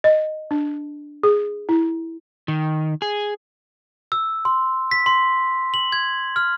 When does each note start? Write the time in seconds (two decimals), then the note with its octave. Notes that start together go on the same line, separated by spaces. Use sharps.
0.04 D#5
0.51 D4
1.23 G#4
1.69 E4
2.48 D#3
3.02 G#4
4.12 E6
4.45 C6
4.91 B6
5.06 C6
5.74 F#7
5.92 G#6
6.36 F6